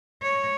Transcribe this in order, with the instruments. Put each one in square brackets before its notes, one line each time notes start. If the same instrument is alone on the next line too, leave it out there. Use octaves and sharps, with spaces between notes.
[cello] C#5